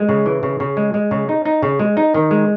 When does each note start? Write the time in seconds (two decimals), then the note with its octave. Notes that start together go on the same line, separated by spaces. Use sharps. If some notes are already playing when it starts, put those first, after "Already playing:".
Already playing: G#3
0.09 C#3
0.26 E3
0.43 C#3
0.60 C#3
0.77 G#3
0.94 G#3
1.11 C#3
1.29 D#4
1.45 D#4
1.63 C#3
1.79 G#3
1.97 D#4
2.14 D#3
2.31 G#3